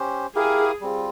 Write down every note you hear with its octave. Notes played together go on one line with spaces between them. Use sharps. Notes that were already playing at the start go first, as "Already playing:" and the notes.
Already playing: C#4 G4 C5
E4 G4 G#4 A#4 F5
G3 C4 F4